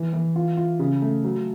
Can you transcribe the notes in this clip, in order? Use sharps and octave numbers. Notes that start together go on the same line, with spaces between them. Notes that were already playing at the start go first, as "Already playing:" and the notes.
Already playing: E3
E3
F4
F4
C#3
A3
F#3